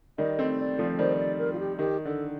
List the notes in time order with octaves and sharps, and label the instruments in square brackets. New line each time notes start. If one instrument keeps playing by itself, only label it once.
[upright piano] D#3 G3 [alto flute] D#5
[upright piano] A3 C4
[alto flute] D5
[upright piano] F3 A3
[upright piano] D#3 G3 [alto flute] C5
[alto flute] D5
A#4
F4
G4
[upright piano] D#3 [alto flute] G4
[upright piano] D3 [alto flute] A4